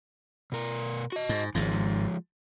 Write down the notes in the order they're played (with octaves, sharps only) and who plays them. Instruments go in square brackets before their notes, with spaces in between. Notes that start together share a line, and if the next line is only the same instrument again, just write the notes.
[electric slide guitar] B2 A#4
F#4 D#5
[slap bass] G#2
[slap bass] G#1 G#2 [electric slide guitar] F3 G#3